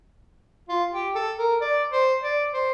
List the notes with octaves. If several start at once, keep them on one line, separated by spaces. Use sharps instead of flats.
F4
G4
A4
A#4
D5
C5
D5
C5